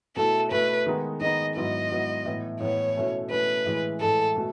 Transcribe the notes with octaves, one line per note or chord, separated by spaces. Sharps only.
B2 A3 E4 A4
B2 A3 E4 B4
D#3 G#3 B3 D#4
D#3 G#3 B3 D#4 D#5
G#2 F#3 B3 E4 D#5
G#2 F#3 B3 E4
A2 E3 B3
A2 E3 B3 C#5
B2 A3 C#4 E4
B2 A3 C#4 E4 B4
A2 E3 G#3
A2 E3 G#3 A4
B2 A3